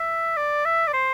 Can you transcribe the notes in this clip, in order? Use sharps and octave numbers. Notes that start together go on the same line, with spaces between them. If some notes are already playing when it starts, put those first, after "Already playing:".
Already playing: E5
D5
E5
D5
C5